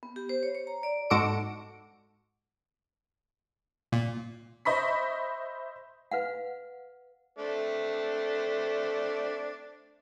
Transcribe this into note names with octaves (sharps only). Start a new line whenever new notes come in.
B3
G4
C5
C#5
C#5
A#5
D5
G#2 F#4 A4 D6 D7
A#2
C5 D#5 E5 B5 C#6 B6
B4 F5 F#5
A3 C4 D4